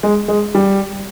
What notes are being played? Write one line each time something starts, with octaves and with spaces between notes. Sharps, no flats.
G#3
G#3
G3